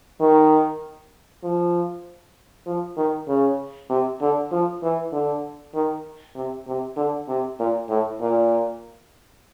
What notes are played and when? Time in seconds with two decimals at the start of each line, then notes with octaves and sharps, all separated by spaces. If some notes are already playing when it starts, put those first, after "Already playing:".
0.20 D#3
1.44 F3
2.67 F3
2.97 D#3
3.28 C#3
3.90 C3
4.21 D3
4.52 F3
4.83 E3
5.13 D3
5.75 D#3
6.36 C3
6.67 C3
6.97 D3
7.29 C3
7.59 A#2
7.89 A2
8.21 A#2